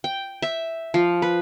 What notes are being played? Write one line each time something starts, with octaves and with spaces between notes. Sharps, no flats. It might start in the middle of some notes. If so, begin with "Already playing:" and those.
G5
E5
F3
B4